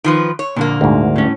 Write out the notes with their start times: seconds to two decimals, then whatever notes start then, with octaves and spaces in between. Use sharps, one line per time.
0.04 D#3 F3 B4
0.39 C#5
0.56 F2 A#2 D3 A#3
0.81 D2 G#2
1.16 A2 C#4